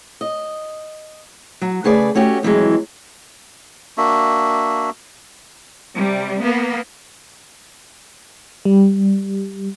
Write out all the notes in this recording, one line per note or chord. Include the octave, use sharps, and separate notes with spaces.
D#5
F#3
C#3 A3 G#4 B4 D5
A3 C#4 F#4 G4
F2 E3 F#3 G#3
A#3 D4 F#4 E5
C3 G3
A#3 B3
G3